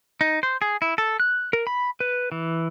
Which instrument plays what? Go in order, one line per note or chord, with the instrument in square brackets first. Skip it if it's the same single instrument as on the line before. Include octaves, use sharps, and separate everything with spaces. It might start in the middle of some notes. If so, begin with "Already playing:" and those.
[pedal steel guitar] D#4
C5
G#4
E4
A4
F#6
A#4
B5
B4
E3